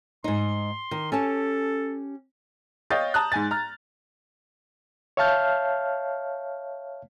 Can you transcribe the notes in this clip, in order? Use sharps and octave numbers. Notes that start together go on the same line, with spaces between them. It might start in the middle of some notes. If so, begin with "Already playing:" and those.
G#2 D#4 C6
D#3
C#4 G4 A4 A5
C#5 D#5 F5 G5 G6 A6
A5 A#5 D#6 F#6
G#2 G#5 A6
A#5 F6
C#5 E5 F5 A5 F6 G6